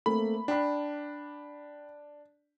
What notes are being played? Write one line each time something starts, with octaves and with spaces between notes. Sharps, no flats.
A3 A#3 C4 B5
D4 G5 B5